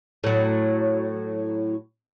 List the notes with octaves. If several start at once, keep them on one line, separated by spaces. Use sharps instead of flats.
A2 F#3